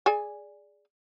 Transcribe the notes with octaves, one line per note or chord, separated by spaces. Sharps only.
G#4 D5 G#5